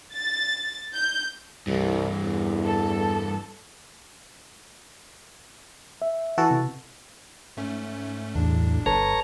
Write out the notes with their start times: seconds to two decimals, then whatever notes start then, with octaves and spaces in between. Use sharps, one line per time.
0.14 A6
0.94 G6
1.67 C2 G2 E3
2.24 E2
2.64 A4
6.02 E5
6.38 E3 F#4 A4
6.51 C3
7.57 G#2 A3 C#4
8.35 B1 E2 A2 D4
8.86 G1 A4 B4 C#5 A5 A#5